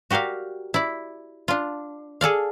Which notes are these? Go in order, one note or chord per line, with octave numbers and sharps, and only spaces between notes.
F#4 G4 A#4 D5 F5
E4 D5
D4 F4
G#4 A4 D5 F5